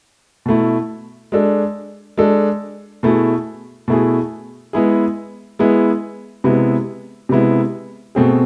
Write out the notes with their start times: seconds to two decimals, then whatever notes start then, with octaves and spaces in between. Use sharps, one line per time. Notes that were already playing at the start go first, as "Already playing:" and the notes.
0.46 B2 A3 E4
1.32 G#3 D4 A4
2.18 G#3 D4 A4
3.03 B2 A3 E4 G#4
3.88 B2 A3 E4 G#4
4.73 G#3 B3 E4 G#4
5.59 G#3 B3 E4 G#4
6.44 C3 G#3 B3 E4
7.29 C3 G#3 B3 E4
8.15 B2 A3 C4 G#4